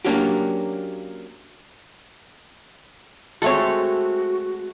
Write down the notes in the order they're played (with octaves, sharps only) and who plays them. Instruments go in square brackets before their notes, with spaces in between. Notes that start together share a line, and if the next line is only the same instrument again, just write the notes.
[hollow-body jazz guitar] F#3 A#3 C#4 D4 F#4 G4
[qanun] G#3 A3 C4 [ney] F#4 [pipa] A4 C#5